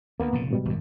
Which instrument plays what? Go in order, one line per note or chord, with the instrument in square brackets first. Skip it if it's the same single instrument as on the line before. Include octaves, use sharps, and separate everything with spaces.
[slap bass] D2 [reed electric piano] A#3 B3 A#4
[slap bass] F1 A#2 C#3
[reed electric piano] G#2 B2 G3
[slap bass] G#1 F#2